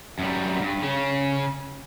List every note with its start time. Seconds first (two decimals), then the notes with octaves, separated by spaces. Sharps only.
0.19 F#2 G3
0.61 G2
0.83 C#3 C#4